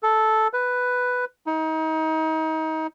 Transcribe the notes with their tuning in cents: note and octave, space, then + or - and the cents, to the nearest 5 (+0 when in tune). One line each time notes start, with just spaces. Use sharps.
A4 -5
B4 +5
D#4 +30